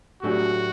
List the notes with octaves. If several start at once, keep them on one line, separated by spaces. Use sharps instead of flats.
A2 F#3 A3 D4 F#4 G4